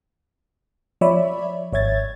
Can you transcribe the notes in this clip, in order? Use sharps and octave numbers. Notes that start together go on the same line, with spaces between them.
F3 C#5 D5 E5 B5
G#1 C#5 E5 G#6 A6